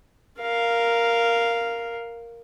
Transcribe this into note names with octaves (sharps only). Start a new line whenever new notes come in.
A#4 F5